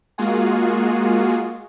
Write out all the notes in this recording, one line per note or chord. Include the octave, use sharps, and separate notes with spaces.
G#3 A#3 F4 F#4 G#4